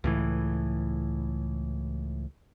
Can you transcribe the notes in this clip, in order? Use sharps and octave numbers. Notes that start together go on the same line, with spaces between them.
C#2 A2 E3